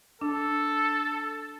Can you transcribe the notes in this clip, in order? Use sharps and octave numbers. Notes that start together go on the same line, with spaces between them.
D4 A4